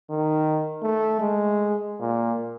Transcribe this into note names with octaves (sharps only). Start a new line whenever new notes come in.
D#3
A3
G#3
A#2